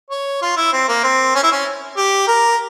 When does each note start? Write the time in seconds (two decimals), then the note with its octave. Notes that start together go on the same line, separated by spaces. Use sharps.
0.10 C#5
0.42 F4
0.57 E4
0.73 C4
0.88 A#3
1.04 C4
1.35 C#4
1.43 E4
1.52 C#4
1.97 G4
2.28 A#4